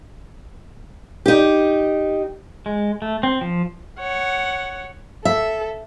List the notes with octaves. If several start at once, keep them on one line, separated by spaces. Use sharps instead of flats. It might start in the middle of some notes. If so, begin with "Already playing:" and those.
D#4 G4
G#3
A3
C4
F3
C#5 F#5
A4 E5